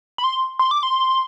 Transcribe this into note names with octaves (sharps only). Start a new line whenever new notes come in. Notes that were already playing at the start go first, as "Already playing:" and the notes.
B5
C6
C6
D6
C6